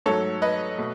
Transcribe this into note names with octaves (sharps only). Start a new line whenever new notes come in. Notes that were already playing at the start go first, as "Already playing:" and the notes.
G#2 F#3 A3 A4 C#5
B4 D#5
B2 A3